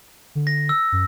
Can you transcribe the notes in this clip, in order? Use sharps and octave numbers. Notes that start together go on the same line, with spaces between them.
D3
A#6
E6
F#2